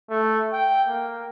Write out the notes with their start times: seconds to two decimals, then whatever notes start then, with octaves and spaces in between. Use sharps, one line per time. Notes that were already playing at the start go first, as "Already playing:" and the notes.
0.10 A3
0.53 G5
0.88 A#3